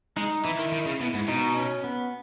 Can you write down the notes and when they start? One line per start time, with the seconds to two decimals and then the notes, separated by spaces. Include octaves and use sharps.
0.17 G#3 D#4
0.44 E3 E4
0.59 D#3
0.72 D#3
0.86 C#3
1.01 B2
1.14 G#2
1.28 B2 D#4
1.56 C#4
1.84 B3